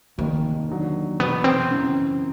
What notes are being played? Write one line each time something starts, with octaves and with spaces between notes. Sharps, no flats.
F1 D#2 D#3 A#3
D#2 D3 F#3
F1 E2 B2 B3
C4
F#2 C#3 E3